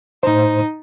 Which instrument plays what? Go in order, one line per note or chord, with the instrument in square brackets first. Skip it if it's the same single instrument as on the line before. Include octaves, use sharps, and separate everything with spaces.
[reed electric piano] A2 C5 [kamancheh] D#4